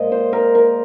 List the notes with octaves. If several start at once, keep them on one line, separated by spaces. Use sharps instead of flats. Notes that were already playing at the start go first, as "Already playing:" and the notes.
Already playing: A#2 F3 G#3 D#5
C5
A#4
A#4